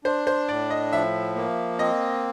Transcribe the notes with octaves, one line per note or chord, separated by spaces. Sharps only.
D4 C5
C5
A2 D5
D#5
F3 E5
A#3
C4 D#5